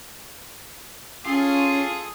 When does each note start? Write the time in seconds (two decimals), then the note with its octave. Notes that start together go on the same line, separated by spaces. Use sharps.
1.26 C#4 F4 G#4 A4 D#6